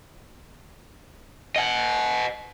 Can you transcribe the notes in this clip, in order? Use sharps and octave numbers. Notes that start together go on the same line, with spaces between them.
D#5 F#5